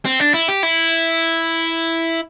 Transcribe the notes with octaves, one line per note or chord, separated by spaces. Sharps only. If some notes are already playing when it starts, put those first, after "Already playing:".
C4
D4
E4
G4
E4